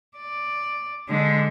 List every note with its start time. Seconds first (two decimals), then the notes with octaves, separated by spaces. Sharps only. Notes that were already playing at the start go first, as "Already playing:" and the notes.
0.17 D5
1.09 D3 G#3